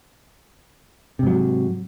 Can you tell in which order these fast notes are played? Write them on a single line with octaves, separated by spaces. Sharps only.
C3 G#2 F#3